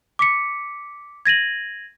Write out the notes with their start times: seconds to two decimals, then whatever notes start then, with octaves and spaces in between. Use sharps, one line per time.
0.19 D6 B6 C#7
1.26 G#6 A#6 D#7 F#7